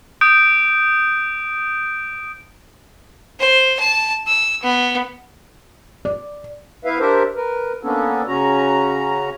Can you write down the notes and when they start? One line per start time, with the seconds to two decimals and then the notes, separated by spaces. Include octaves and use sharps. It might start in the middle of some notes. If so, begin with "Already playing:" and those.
0.21 D#6 G6 D7
3.39 C5
3.80 A5
4.27 E6
4.63 B3
6.05 D5
6.85 B3 E4 B4 E5 F5
6.99 D4 G4 A#4 C5 E5
7.36 A#4 B4
7.83 A#3 B3 C#4 D4 A4
8.27 C#3 C#4 F#4 A#5